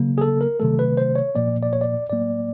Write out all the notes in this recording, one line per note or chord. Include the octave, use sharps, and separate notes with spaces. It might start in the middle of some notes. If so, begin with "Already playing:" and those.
Already playing: C#3 F#3 A#3
G#4
A4
A#4
C3 D#3 F#3 A3 A4
B4
C5
C#5
A#2 F3 A#3 D5
D5
C#5
D5
A2 F#3 A#3 D5